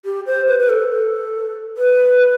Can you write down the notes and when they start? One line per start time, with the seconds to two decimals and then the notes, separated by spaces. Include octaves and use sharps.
0.05 G4
0.26 C5
0.48 B4
0.60 B4
0.69 A4
0.92 A4
1.77 B4